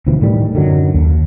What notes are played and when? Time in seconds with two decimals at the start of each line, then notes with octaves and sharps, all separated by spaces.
0.07 D2 B2 E3 F3
0.21 A2 D#3 G3
0.54 F#2 D3 D#3 F#3
0.94 D#2